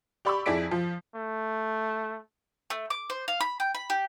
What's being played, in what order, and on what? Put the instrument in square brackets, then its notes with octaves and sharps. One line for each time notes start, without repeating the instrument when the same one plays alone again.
[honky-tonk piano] G4 D5 B5 C#6 D6 E6
F2 E4 G#4 D5 B6 D7
F3
[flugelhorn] A3
[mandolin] A3
D6
C5
F5
B5
G5
B5
G4